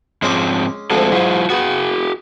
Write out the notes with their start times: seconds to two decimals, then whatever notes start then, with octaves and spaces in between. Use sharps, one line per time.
0.22 G#2 F3 G#3 C4 C#4 D6
0.91 D2 F3 G#3 C4 A4
1.12 G#2 F#3 E4 F4
1.50 B3 F#4 G#4 F#5